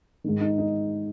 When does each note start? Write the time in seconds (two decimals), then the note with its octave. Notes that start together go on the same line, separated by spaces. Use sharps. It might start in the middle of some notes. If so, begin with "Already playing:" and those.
0.24 G#2 D#3
0.41 D#4
0.58 D#4